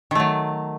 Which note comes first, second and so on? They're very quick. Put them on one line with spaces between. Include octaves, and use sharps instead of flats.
D#3 A3 F#3